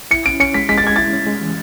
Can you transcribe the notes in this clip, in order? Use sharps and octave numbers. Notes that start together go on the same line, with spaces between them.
E4 C#7
C#4 D7
C#4 C#7
G#3 B6
G#3 B6
A6
G#3 G#6
E4 A6
C#4
G#3
E3